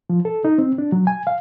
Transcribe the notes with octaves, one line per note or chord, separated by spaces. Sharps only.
F3
A4
D#4
C4
D4
F#3
G#5
F5